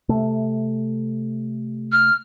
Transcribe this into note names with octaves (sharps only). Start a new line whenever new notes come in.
C3 A3
F6